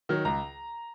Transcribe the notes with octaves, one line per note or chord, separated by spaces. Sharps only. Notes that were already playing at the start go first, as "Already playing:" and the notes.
D#3 F#3
C#2 A#5